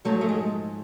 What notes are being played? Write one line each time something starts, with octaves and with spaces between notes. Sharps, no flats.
G#2 F3 F#3 A3
A3
G#3